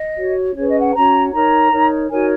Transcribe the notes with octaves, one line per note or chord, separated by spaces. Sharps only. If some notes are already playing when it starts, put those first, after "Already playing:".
Already playing: D#5
F#4 C#5
C#4 G#4 B4 C#5
D#5
F#5
C#4 F#4 C#5 A#5
D#4 A#4 C#5 A#5
D#4 A#4 C#5
D#4 F#4 A#4 C#5 G#5